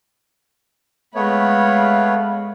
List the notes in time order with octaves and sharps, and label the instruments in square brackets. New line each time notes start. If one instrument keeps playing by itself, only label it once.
[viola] G#3 B5 [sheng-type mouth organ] A3 B3 C#5 [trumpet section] F5